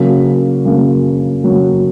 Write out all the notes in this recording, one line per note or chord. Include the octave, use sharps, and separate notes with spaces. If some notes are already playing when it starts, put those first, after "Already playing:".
Already playing: C#3 F#3 A#3
C#3 F#3 A#3
C#3 F#3 A#3